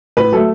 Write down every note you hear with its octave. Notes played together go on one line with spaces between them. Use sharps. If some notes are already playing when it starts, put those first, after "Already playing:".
A2 B4
F#3 A3 A4